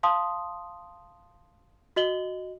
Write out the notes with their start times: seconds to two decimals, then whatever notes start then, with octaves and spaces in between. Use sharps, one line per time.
0.03 F5 A5 C6 D#6
1.96 F#4 D#5 F#7 G7